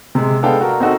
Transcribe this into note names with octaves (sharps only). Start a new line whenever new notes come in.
C3 G#3
G#3 B3 D4 A4 F5 G5
F#4 A#4
C4 D#4 F#4 A4